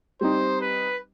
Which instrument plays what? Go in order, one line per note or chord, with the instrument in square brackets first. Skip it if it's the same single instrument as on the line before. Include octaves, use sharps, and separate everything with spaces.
[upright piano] G3 C4 D#4 [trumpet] C5
[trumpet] B4